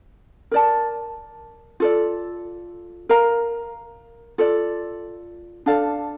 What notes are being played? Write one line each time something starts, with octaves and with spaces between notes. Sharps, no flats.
A#4 D5 A5
F4 A4 D5
A#4 F5 A#5
F4 A4 D5
D4 A4 D5 F5